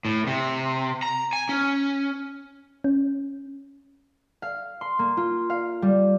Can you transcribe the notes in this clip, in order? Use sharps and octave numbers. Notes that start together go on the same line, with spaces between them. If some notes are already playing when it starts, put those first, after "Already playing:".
A2
C3
A#5
G#5
C#4
C#4
F5
C6
A#3
F4
F5
G3